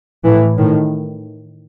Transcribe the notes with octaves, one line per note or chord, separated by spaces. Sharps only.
A2 E3
A2 D#3